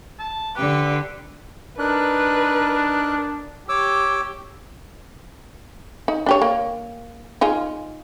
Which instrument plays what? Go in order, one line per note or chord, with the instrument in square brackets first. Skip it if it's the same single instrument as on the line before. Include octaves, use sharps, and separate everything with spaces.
[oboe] A5
[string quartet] D3 G4 [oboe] B4
[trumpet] D4 [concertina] D#4 A#4 F#6 [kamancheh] B4
[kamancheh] G4 [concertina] C#5 D6 E6
[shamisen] D#4
D4 G4 C#5
A#3
D#4 F4 G#4